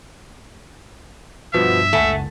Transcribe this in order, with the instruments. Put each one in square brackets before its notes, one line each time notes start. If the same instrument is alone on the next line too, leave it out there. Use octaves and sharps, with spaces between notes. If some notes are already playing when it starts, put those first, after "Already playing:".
[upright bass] G2 [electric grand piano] B2 F3 B3 [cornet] E5
[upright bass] F#1 C#2 [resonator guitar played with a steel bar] A3 [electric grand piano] F#5 G#5 A5